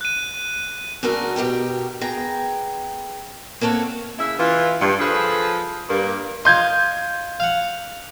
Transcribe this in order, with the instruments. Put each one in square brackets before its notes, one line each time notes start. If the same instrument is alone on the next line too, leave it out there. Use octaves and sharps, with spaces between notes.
[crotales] F#6 D#7
[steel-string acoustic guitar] F#2 C#3 A3 D4 F#4 A#4
B2 G4 A#4 G5
B3 G#4 G5 A#5
A#3 C4 A4 C#5 F#5
[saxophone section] C#3 E4 E5
E3 F4
G2
F3 G#4 A4 B4
G2 A#3
[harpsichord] F4 D#5 [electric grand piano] C6 G6 G#6
[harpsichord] F5 F#5